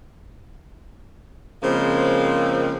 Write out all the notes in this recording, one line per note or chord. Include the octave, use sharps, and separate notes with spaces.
C#3 F3 G#3 A#3 C4